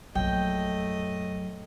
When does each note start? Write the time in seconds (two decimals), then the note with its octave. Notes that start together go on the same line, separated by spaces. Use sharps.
0.15 A#1 F#2 F#3 A3 D#5 G5